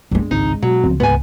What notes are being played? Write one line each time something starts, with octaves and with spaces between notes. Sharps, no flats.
G2 G#3
G#1 C#2 C4 D#4
B2 F#3
C#2 F3 C4
C2 G#2 G#3 B3 G#5